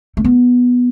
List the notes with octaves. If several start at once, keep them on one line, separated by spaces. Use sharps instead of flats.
A3
B3